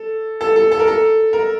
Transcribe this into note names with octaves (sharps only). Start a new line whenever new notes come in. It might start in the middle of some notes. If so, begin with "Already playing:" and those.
Already playing: A4
A4
A4
A4
A#4
A4
A#4